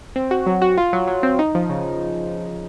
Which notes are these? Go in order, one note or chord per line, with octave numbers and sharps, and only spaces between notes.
C4
F#4
F#3
F#4
F4
F#3
F#3
C4
D#4
F3
C#3